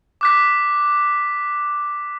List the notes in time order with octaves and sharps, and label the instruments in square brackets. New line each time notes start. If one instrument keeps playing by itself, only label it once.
[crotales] D6 F#6 B6